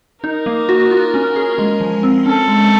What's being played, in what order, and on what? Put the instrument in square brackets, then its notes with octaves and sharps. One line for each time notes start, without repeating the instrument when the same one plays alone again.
[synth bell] D#4 [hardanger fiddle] A#4
[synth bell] A#3
F#4
F4
C#4
G#4
G#3
F3
C4
[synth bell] C#4 [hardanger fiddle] A4
[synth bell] G#3